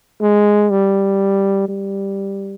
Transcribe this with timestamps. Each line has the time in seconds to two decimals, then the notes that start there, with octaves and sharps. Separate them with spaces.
0.22 G#3
0.71 G3
1.69 G3